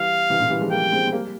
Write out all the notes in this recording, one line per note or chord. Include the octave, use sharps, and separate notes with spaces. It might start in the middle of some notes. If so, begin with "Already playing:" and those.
Already playing: E3 G3 F5
C3 E3
A#2 C#3
E3 G3
F3 G#3
G3 A#3 G5
G#3 C4
C4
G3 A#3